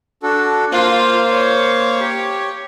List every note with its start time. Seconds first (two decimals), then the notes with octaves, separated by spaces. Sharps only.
0.23 D4 F#4 A4
0.72 A#3 F4 C5 F5
1.31 C#5
2.00 G4